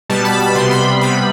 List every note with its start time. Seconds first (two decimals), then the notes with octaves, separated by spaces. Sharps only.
0.09 B2 G3 B3 A5
0.25 B5
0.40 B5
0.55 C3 G3 B3 C6
0.71 B5
1.01 C3 G3 B3 B5